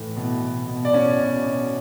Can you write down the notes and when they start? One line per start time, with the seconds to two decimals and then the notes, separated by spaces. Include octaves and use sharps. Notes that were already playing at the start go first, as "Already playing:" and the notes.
Already playing: A2 E3
0.16 B2
0.42 B2
0.68 B2
0.85 D5
0.93 B2 C#4 C#5
1.19 B2
1.45 B2